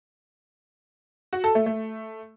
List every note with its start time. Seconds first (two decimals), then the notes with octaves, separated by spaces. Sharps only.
1.33 F#4
1.44 A4
1.55 A3
1.66 A3